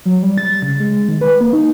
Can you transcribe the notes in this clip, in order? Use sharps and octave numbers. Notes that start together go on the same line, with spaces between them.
F#3
G3
A6
C#3
G#3
D#3
B4
A#3
D#4